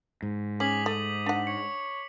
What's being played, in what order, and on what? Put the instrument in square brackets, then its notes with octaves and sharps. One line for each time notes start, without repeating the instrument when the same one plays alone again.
[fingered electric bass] G#2
[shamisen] C#4 [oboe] G#4 [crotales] D6 B6 F#7
[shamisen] A3 [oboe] D#6
[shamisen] D4 F#5
[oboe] C#5 [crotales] C#7